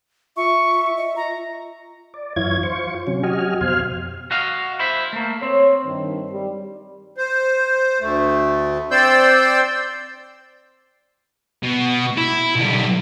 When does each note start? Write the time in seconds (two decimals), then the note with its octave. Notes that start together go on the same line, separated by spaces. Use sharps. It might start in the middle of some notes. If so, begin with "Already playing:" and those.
0.37 F4 E5 C#6
0.97 D#5
1.16 F4 A#5
2.14 D5
2.36 F#2 E3 E4 F4 C#5 G#6
2.63 F4 C5 C#6
3.07 C3 F#3 C#4
3.23 F#3 F#4 G4 D#5 G#5 F6
3.61 F2 B2 C5 F5 G#5 F6
4.31 F#4 D#5 F5
4.79 E4 C5 E5
5.13 A3 A#3
5.42 C4 C#5
5.86 G2 D#3
6.32 G3
7.17 C5
8.01 D2 A3
8.91 C4 C5 D5 C6 E6 G6
11.63 B2
12.18 E4
12.56 B1 G3